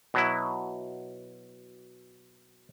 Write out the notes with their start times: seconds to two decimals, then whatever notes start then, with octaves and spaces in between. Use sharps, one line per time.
0.14 B2 F#3 E4